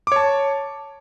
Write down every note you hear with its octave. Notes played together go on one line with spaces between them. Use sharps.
C#5 A5 D6